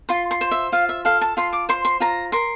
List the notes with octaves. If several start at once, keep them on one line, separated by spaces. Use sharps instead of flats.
F4 C6
C6
C5
E5
F4 F5
E5
A4 F5
A5
F4 C6
D6
C5 C6
C6
F4 A#5
A#4 C6